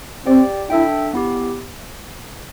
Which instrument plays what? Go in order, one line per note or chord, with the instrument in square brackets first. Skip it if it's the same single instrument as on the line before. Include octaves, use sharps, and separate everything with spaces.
[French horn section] C4 [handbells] G4 D5 G5
[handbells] D4 A4 E5 G5 [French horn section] E4
[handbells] B3 E4 G4